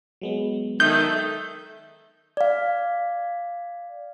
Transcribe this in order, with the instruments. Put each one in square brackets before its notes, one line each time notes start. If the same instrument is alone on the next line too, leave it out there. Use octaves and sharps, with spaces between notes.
[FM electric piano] F#3 G#3 B3
[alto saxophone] D#3 [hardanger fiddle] A4 E5 [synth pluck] G6
[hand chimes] D5 F5